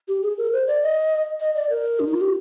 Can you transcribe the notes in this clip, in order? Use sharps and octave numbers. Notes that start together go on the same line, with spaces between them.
G4
G#4
A#4
C5
D5
D#5
D#5
D5
A#4
D4
D#4
F4
G4